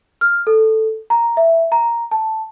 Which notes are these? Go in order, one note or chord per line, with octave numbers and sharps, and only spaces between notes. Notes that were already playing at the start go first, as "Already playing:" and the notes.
F6
A4
A#5
E5
A#5
A5